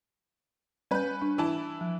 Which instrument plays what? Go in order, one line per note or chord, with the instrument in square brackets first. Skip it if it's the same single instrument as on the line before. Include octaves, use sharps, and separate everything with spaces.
[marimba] G3 G6 [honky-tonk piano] C#4 B4
[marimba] D4
[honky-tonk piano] E3 E4 A5
[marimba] F3